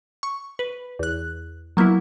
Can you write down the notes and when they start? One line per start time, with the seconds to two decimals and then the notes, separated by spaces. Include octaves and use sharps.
0.23 C#6
0.59 B4
0.99 E2 F#6
1.77 F#3 A#3 B3 E4